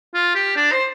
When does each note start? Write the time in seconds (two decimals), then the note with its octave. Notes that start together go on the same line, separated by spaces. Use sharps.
0.14 F4
0.35 G4
0.56 D4
0.72 C5